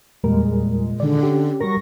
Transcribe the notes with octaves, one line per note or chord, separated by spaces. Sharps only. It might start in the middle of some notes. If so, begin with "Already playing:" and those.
E2 A#2 G3 G#3 A#4
D3 D#3 D5
C#4 G4
F#3 G3 A#4 C#6 A#6